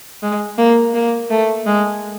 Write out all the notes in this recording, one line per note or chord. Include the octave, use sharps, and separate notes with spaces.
G#3
A#3
A#3
A3
G#3